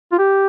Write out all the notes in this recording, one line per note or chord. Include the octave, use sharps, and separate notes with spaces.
F4
G4